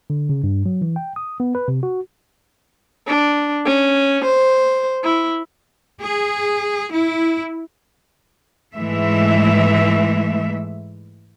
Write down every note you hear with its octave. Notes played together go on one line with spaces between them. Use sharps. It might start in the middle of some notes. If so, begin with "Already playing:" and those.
D3
C#3
G2
F#3
E3
G5
D#6
B3
B4
C3
F#4
D4
C#4
C5
E4
G#4
E4
G#2 E3 G#3 A3 E5